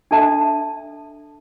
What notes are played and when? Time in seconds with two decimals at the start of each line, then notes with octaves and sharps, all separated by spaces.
0.11 D4 A4 E5 A5